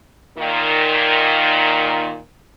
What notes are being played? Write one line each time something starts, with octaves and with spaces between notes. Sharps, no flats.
A#2 D#3